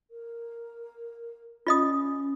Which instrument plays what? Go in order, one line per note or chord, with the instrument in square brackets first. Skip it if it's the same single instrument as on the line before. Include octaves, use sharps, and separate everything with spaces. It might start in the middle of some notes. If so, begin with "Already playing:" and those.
[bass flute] A#4
[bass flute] C#4 [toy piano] F4 D#5 D#6